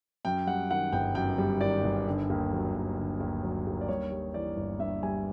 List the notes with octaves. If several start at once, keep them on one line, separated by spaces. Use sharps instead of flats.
F#2 G5
G3 F#5
D#3 F#5
G1 G5
F#2 G5
G3
D#3 D5
G1
D3
D#2
F#3
D#2
D3
D#2
F#3
D#2
D5
G2 C#5
G3
E3 D5
G1
G2 E5
G3 G#5